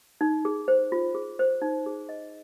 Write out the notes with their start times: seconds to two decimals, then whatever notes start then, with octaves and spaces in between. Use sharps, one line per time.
0.21 D#4
0.45 G#4
0.68 C5
0.92 F4
1.15 G#4
1.39 C5
1.62 D#4
1.86 G#4
2.09 D#5